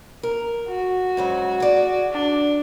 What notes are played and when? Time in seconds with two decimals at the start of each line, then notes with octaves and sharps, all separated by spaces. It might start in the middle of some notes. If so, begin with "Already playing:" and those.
0.23 A#4
0.68 F#4
1.17 G#2 C#3 F#3
1.60 G#4 D5
2.12 D4